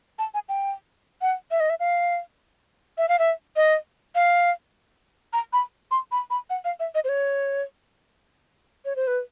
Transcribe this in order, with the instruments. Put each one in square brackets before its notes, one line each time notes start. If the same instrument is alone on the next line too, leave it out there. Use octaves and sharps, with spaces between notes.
[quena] A5
G#5
G5
F#5
E5
D#5
E5
F5
E5
F5
E5
D#5
F5
A#5
B5
C6
B5
B5
F#5
F5
E5
D#5
C5
C#5
C#5
C5
B4